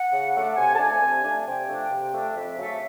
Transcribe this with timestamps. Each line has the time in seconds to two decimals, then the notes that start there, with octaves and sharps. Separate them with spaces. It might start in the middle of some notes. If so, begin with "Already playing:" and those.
Already playing: F#5
0.12 C#3
0.35 F#3 A3 D4
0.56 C3 G#5
0.75 A5
0.79 F3 A3 D4 G#5
1.01 C3
1.24 F3 A3 D4
1.46 C3 G5
1.69 F3 A3 D4
1.90 C3
2.13 F3 A3 D4
2.34 F2 E5
2.57 C#3 F#3 A3